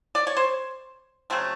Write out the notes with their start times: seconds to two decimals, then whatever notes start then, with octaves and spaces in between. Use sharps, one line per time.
0.15 D5
0.27 C#5
0.37 C5
1.30 C#3 F#3 A3 C4